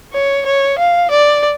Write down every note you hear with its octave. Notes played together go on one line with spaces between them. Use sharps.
C#5
C#5
F5
D5